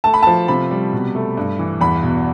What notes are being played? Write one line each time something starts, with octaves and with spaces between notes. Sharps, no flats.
A3 A5
B5
F3 A5
C3 B5
G3
B2
A3
G2
E3
E2 B5
B2